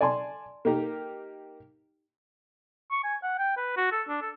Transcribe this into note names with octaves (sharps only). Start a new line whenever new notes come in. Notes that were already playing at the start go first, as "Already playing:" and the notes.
D5 G#5 A5 C6
A#3 D#4 G4 A#4
C#6
G#5
F#5
G5
B4
F#4
A4
D4
A4